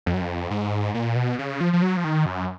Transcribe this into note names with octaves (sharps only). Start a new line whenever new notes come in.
F2
F#2
F2
G#2
A#2
B2
C#3
F3
F3
F#3
F3
D#3
F#2